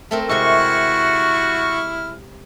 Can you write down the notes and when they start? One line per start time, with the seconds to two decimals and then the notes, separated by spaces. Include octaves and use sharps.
0.11 A3 C4 A#4
0.29 C3 G#3 E4 F#4 C#6 F6